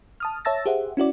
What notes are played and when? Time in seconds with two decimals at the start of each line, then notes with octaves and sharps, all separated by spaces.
0.20 A5 D#6 F6
0.45 C#5 E5 A5 E6 A6 A#6
0.66 G4 G#4 C5 E5 F#5
0.97 C#4 E4 F#4 D5